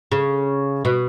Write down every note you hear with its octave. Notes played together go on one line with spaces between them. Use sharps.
C#3
B2